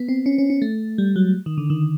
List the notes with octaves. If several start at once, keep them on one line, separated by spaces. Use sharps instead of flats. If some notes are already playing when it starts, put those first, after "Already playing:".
Already playing: B3
C4
C#4
C#4
C#4
A3
G3
F#3
D#3
D3
D#3